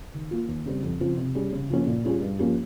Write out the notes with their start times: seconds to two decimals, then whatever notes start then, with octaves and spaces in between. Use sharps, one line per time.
0.14 D#3
0.31 A#3 F4
0.48 D#2
0.66 C#3 G3 C4
0.83 F2
1.00 C#3 F3 C4 F4
1.17 C3
1.35 G3 C#4 G#4
1.52 C#3
1.70 F3 A#3 C#4
1.87 A#2
2.04 G3 C#4 F4 G#4
2.21 G2
2.39 F3 A#3 C#4 G4